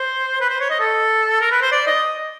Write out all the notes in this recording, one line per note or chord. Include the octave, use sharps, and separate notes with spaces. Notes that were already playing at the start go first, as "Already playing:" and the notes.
Already playing: C5
B4
C5
C#5
D#5
A4
A#4
B4
C5
D5
D#5